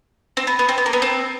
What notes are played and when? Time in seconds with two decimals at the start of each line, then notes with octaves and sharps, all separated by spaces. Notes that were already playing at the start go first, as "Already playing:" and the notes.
0.37 C4
0.47 B3
0.59 B3
0.69 C4
0.78 B3
0.86 A#3
0.93 B3
1.02 C4